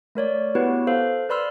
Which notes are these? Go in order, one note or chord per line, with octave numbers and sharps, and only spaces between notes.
A3 A#4 C#5 D5
B3 E4 F#4 G4 B4 C#5
A4 C5 F5
B4 D5 B5 C6 E6 F6